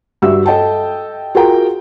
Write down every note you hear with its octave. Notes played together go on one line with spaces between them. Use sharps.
G2 F#4 G4 E5 E6
A4 D#5 G5 A5
F4 F#4 G#4 A#4 G5 A#5